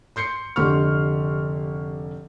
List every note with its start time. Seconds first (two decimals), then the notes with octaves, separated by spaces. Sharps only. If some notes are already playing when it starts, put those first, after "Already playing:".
0.16 C6 G6 C7 C#7
0.56 F1 D3 G4 C6 C#6 F6